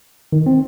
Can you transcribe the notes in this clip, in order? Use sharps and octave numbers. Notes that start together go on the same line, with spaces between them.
D#3
C4